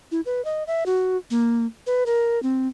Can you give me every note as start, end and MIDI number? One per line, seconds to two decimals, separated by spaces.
0.12 0.21 64
0.26 0.44 71
0.45 0.63 75
0.67 0.84 76
0.86 1.17 66
1.31 1.66 58
1.87 2.04 71
2.06 2.42 70
2.43 2.68 60